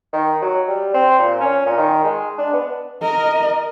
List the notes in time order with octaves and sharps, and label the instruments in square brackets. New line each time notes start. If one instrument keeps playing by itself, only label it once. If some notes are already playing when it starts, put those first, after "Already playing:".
[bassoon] D#3
F#3
G3
C4
A#2
C#4
A#2
D#3
G#3
D4
B3
[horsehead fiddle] A#4 D#5